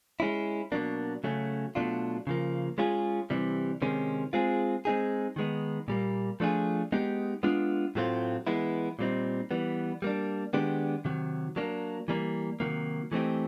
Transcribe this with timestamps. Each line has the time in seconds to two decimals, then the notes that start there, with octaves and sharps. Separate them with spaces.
0.20 G#3 C#4 E4
0.72 B2 F#3 A#3 D4
1.24 C#3 F#3 A3 C#4
1.75 B2 F#3 A3 D4 F4
2.27 C#3 F3 A#3
2.78 G#3 C#4 F4 G#4
3.30 C3 E3 G3
3.82 C3 D#3 G#3 C#4
4.33 G#3 C4 F4 G#4
4.85 G#3 C4 D#4 G#4
5.36 D#3 G#3 B3 D#4
5.88 A#2 G3 A#3
6.40 F3 A3 D4 F4 G#4
6.92 G#3 B3 D#4 G4
7.43 G#3 B3 D4 F4
7.95 A2 F#3 A3 C4 F4
8.47 E3 G#3 B3 E4
8.99 A#2 G3 C4 D#4
9.51 E3 G3 B3
10.02 G3 A#3 D4
10.53 D#3 G#3 B3 D4 G4
11.05 C3 D#3 F#3
11.56 F#3 A#3 D4
12.08 E3 G3 A#3
12.60 C3 D#3 F#3 A#3
13.12 E3 A3 C4 D#4 G4